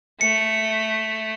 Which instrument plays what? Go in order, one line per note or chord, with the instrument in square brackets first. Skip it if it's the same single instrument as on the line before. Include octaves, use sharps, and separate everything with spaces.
[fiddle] A3 [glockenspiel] C#7